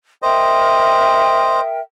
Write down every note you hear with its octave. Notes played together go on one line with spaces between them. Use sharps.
A#4 C5 D#5 E5 G5